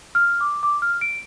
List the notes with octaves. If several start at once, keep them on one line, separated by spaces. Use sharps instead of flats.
F6
D6
D6
F6
D7